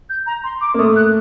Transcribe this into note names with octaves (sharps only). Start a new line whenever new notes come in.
G6
A#5
C6
D6
A#3
A3 D#6
F#6